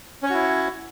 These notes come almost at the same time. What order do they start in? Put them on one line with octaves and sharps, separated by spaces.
C#4 C#5 F#4 E4